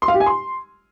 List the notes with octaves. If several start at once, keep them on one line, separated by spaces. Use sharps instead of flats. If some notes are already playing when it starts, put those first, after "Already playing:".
C6
F5
G4
G#5
C6